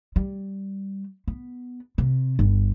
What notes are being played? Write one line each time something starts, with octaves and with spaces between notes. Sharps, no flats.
G3
B3
C3
G1